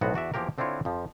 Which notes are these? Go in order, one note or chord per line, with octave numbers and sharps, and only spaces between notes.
B1 A2 B3 C4 F#4 F#5
E2 F#4 D5 E5
E2 F3 A#3 G4 A#4
D3 C4 D4 E4 F4 C#5
F2 F3